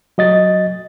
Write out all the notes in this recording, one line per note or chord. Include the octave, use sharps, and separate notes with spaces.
F#3 D#5 A6